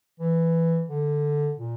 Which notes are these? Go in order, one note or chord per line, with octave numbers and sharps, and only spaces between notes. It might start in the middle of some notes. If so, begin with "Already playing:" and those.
E3
D3
A#2